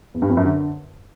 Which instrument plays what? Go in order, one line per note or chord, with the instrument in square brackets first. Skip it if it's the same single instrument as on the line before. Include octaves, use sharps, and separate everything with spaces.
[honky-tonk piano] E2
G2
F2
F#2
D3